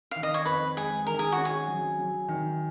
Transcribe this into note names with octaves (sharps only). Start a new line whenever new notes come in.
D#3 F5
D#5
C#5
F2 B4
G#3 G#4
D#3 A#4
G#4
C#4 F#4
G#4
F#3
F#3
D#3